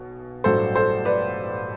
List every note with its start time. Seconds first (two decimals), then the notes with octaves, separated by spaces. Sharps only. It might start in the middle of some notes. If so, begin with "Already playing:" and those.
Already playing: B1 B2
0.44 A1 G2 F#3 A4 C5
0.75 A4 C5
1.05 B4 D5